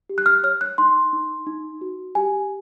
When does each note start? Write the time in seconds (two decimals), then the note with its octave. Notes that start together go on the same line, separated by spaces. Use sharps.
0.09 G4
0.18 F#6
0.26 F6
0.44 C#5 F6
0.61 F#6
0.78 D#4 C6
1.13 D#4
1.47 D#4
1.81 F#4
2.15 G4 G#5